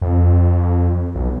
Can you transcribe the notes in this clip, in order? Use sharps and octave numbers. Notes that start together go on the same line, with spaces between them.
F2
B1